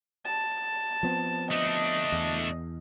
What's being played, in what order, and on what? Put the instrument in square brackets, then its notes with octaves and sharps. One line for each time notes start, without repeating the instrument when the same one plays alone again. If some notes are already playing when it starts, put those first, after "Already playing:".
[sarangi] A5
[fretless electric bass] F3 B3 C4
[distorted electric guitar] A3 D4 [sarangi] D#5
[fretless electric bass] E2